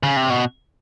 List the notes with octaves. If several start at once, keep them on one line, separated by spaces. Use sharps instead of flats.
C#3
C3
B2